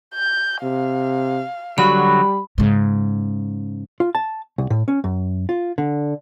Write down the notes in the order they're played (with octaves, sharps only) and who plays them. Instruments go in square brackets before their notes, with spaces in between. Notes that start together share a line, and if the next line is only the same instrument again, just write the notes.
[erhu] G6
[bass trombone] C3 [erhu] F5
[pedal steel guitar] D3 F#3 F#4 [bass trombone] G3 [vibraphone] B5
[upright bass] G#2 C#3
[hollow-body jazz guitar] F4
A5
C2
A2
C#4
F#2
F4
D3